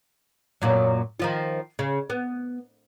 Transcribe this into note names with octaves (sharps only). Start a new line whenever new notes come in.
F#2 A#2 F#3
D#3 F3 F4
C#3
B3